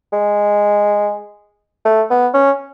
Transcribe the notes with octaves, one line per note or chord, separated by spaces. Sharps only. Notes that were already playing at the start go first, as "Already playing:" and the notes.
G#3
A3
B3
C#4